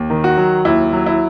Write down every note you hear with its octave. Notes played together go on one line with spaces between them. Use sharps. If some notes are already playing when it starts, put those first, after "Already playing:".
Already playing: D#2
D#3
F#4
F#3
D#2 E4
F#3
E4